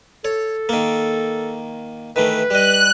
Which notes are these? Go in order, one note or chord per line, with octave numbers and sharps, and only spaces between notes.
A4 C#5
D#3 A#3
D#3 E3 A3 B4
G3 D#5 F#6